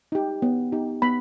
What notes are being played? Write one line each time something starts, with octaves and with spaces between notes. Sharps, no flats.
D#4 G4
B3
D#4 G4
B3 B5